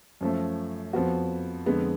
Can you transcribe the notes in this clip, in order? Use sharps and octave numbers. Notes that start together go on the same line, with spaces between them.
F#2 F3 A3
F2 F3 B3 F#4
F2 D3 G#3 B3